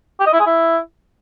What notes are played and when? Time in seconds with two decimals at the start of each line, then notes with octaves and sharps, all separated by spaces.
0.20 G4
0.26 D#5
0.33 E4
0.39 G#4
0.46 E4